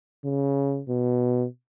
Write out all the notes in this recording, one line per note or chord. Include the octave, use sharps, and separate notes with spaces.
C#3
B2